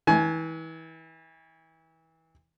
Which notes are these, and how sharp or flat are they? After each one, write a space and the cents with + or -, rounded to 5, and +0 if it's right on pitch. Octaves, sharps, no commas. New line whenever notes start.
E3 -30 G#5 +25